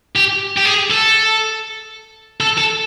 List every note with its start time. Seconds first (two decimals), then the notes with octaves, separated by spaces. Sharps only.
0.15 G4
0.57 G4
0.65 G#4
0.90 A4
2.40 A4
2.58 A4